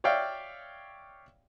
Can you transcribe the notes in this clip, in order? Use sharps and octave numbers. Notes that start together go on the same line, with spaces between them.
C#5 D5 E5 F5 G5